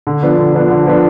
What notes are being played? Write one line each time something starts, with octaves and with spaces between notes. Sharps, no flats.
D3
F3 B3 D4
D3
F3 B3 D4
D3
F3 B3 D4